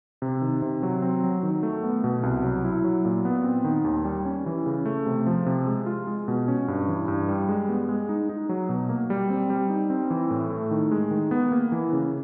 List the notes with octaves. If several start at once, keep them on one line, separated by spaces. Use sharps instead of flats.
C3
D#3
C3
F#3
C4
F#3
D#3
A3
B3
B2
C2
F#3
E4
F#3
A#2
B3
C4
D#3
D#2
G3
C#4
E3
C#3
A3
C3
F3
C3
G#3
F4
G#3
B2
C#4
G2
E3
G2
G3
G#3
B3
G#3
D#4
D#4
F#3
B2
A#3
G3
C4
G3
D#4
C4
E3
A2
A3
D#3
G#3
D#3
B3
A#3
E3
C#3